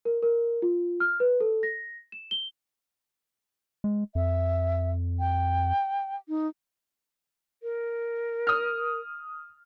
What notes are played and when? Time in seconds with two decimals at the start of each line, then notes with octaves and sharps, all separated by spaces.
0.05 A#4
0.23 A#4
0.62 F4
1.00 F6
1.20 B4
1.41 A4
1.63 A#6
2.12 E7
2.31 G7
3.84 G#3
4.15 F2 E5
5.20 G5
6.29 D#4
7.63 A#4
8.47 D#6 F6